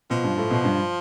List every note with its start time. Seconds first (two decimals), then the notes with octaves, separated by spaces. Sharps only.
0.10 B2 F3
0.24 G2
0.37 A2
0.50 B2
0.64 G2